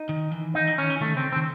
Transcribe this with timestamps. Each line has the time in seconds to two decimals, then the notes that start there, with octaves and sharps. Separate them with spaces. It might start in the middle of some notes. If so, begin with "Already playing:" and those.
Already playing: D#4
0.09 D#3
0.31 E3
0.55 D#3 D#4
0.67 E3
0.78 D#3 C#4
0.90 E3
1.01 D#3 A3
1.14 C#3 C4
1.32 C4
1.36 D#3